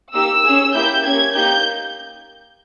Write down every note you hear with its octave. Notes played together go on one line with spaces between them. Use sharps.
A#3 D#4 G4 E6
C#4 G#4
A#3 E4 G4 G6
A#3 C#4 G4 G#6
A#3 D#4 G4 G6